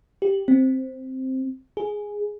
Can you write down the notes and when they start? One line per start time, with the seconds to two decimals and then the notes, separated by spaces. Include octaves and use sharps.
0.22 G4
0.48 C4
1.77 G#4